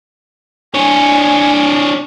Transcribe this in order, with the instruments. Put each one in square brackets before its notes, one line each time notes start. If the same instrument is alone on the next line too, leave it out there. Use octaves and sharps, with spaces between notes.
[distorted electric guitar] D4 C#5 [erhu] G#5